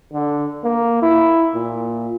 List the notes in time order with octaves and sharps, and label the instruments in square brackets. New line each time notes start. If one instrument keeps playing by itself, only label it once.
[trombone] D3
A#3
E4
A#2